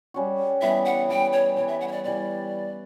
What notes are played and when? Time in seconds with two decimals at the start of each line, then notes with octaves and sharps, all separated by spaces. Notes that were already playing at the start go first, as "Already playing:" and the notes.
0.14 G3 C#4 F#4
0.61 E3 G3 B3 E5
0.85 F#5
1.09 E3 G3 B3 G5
1.33 C#5
1.56 E3 G3 B3 C#5
1.68 E5
1.81 F#5
1.88 C#5
1.92 D5
2.04 E3 G3 B3 D5